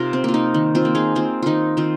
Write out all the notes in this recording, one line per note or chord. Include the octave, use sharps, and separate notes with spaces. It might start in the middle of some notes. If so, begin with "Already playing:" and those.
Already playing: C3 D#4 F4 A#4
C4
A#3 F4
D#4
D#3
C4 F4
A#3
D#4 G#4
A#3 C4 F4
D#3 D#4 F4
D#3 C4 F4